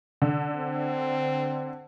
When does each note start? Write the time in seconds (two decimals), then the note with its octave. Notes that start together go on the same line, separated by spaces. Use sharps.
0.22 D3 D4
0.55 C4